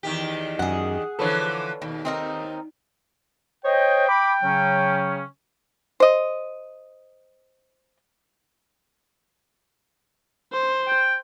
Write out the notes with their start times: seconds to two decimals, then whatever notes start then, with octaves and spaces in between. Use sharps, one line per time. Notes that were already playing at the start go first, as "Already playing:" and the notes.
0.03 E2 D#3 G4
0.59 F#2 G#4 F#5
1.19 D3 E3 F3 A4 B4 C#5
1.82 D#2 B2
2.05 C4 D#4 A#4
3.65 C5 C#5 D#5 G5
4.09 B5 D6
4.43 C#3 F#3 C#4
6.00 C5 D#5
10.53 C5
10.87 G5